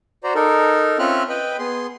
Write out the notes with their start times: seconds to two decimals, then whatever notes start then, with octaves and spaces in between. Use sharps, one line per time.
0.24 F#4 C5 D5 A#5
0.35 D#4 A4 A#4
0.99 C4 C#4 F4 E5 F6 F#6
1.29 B4 D#5 G5 B5
1.59 B3 G#4 C6